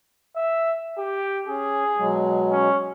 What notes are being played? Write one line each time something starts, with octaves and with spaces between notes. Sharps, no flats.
E5
G4
C#4 G#4
B2 F#3 G#3
C#4